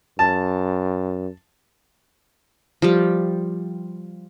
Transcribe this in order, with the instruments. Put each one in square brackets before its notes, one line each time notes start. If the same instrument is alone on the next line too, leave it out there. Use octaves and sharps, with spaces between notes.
[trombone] F#2 [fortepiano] A5
[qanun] F3 G3 G4